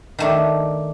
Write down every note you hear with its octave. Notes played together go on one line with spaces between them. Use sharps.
D#3 A3 D4